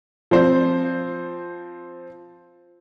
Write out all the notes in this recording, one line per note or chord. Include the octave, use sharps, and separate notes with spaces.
F3 C4 C5